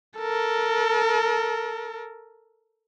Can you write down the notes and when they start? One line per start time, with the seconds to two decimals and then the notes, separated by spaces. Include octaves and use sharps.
0.18 A4 A#4